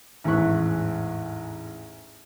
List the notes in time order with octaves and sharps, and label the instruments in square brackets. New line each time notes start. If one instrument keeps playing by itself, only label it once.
[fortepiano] A1 E2 G#2 E5 C#6 F#6